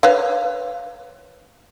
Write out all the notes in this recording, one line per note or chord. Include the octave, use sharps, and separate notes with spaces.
B4 C#5 F5